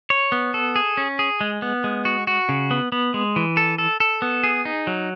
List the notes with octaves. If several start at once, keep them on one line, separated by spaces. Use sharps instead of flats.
C#5
B3
A4
G#4
C#4
G#4
G#3
B3
G#3
F#4
F#4
C#3
B3
B3
G#3
E3
A4
A4
A4
B3
G#4
D#4
F#3